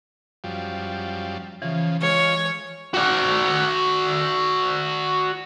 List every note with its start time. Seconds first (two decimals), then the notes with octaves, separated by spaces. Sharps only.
0.44 F#2 F3 G3
1.62 C#3 E3 F3
2.02 G#3 F4 C#5
2.94 F#4 D5